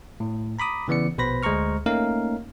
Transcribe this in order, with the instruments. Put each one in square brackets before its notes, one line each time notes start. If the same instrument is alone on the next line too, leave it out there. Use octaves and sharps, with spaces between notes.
[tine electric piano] A2
A#5 B5 D6 D#6
C#3 E3 B3 D5 C#7
A#1 B2 B4 C5 B5 A#6
D2 G#3 C5 A#5 C#6 F6
A3 A#3 C#4 D#4 A#4 F5